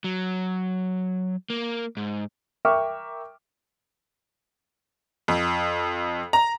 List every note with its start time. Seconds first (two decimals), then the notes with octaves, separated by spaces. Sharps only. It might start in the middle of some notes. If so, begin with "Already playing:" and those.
0.04 F#3
1.50 A#3
1.97 G#2
2.65 A#4 E5 G5 C#6 D6 F6
5.28 F2
6.33 A#5